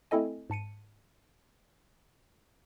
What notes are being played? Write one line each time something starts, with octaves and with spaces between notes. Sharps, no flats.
A3 C4 E4 A4 D#5 G#5
G#2 A5 C#7 D#7